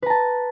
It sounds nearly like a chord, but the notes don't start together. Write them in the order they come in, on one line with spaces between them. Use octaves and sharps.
B4 A#5 A5